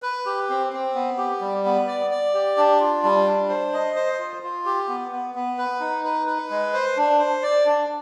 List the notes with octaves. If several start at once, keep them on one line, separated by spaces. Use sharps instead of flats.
B4
G4
C4
C4
B3
G4
G3
B3
D5
D5
G4
D4
F4
G3
D4
C5
D#5
C5
F4
F4
G4
B3
B3
B3
B4
D#4
B4
B4
G#3
C5
D4
C5
D5
D4